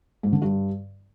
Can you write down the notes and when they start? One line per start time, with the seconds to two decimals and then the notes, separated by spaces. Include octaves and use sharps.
0.23 G#2
0.33 D3
0.42 G2